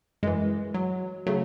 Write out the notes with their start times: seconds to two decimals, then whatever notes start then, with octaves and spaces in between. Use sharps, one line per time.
0.23 F#2 E3 G#3
0.74 F#3
1.27 C#3 F#3 A3